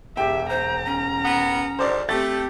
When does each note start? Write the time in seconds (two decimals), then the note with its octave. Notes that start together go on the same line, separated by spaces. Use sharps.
0.17 E1 G4 E5 G5
0.50 C5 A#5
0.86 C#4
1.25 B3
1.79 D2 G#2 D#3 C5 D5
2.09 A3 C4 G4 A6